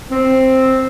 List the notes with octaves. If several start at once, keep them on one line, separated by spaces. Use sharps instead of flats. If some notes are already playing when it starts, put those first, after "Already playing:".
C4